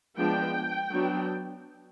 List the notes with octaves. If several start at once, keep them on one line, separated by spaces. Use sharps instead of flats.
F3 G#3 B3 D4 G5
F#3 B3 D4